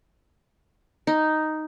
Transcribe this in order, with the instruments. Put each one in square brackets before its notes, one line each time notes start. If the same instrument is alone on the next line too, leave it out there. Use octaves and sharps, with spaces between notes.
[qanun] D#4